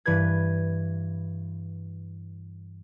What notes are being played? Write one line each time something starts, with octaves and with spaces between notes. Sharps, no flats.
G2 E3 B4 G#6